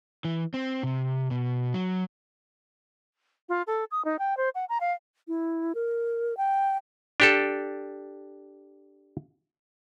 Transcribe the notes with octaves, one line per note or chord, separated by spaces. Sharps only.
E3
C4
C3
B2
F#3
F4
A4
D#6
D#4
G5
C5
F#5
A#5
F5
E4
A#4
G5
D4 G4 A4